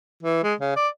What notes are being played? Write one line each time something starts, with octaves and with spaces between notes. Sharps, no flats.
E3
G#3
C#3
D5